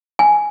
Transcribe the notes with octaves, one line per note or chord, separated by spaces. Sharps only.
G#5